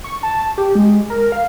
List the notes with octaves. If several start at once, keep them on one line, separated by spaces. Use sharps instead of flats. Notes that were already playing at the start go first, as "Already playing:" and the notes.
C#6
A5
G4
G#3
A#4
F5